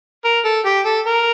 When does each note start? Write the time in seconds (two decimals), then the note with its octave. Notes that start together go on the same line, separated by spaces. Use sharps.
0.25 A#4
0.45 A4
0.66 G4
0.85 A4
1.07 A#4